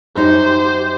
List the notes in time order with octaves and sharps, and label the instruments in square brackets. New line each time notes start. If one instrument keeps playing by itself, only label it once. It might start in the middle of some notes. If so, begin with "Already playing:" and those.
[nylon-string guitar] F#2 D#4 F#4 [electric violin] G4 C5